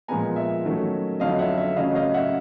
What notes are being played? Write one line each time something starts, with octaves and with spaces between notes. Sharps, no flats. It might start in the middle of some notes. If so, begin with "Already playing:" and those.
A#2 F3 G#3 B3 G#5 A#5
E5
D#3 F#3 A3 C#4
F2 D3 F#3 D#5 F5
E5 F#5
E5
C#3 F#3 A3 C#4 D#5 F5
D#5 F5
E5 F#5